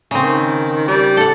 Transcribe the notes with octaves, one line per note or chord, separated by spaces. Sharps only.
C#3 C4
D#3
G3
A4 F#5